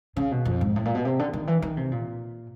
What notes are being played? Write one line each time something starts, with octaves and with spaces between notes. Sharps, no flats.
C#3
B2
F2
G#2
A2
A#2
B2
C3
D3
D#3
E3
D#3
C3
A#2